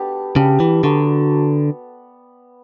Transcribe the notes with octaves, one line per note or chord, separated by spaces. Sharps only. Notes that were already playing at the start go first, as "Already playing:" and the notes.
Already playing: B3 D4 G4 A4 B4
C#3 G3 D4 G4
E3
D3 F#3 B3 D4 F#4